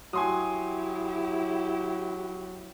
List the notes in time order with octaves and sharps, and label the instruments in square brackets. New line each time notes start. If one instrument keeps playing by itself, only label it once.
[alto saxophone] F#3 [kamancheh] E4 G4 [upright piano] G#5 C6 D#6